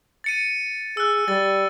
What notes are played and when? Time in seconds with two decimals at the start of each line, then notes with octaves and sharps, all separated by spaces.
0.24 A6 C#7 D#7
0.97 G#4 E6 F#6
1.28 G3 A6